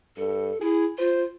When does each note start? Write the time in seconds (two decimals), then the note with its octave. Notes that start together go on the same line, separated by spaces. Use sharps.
0.17 G2 A4
0.61 E4 G#4
0.99 F4 C5